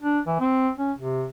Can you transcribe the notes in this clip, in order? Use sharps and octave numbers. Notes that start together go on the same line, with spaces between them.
D4
E3
C4
C#4
C3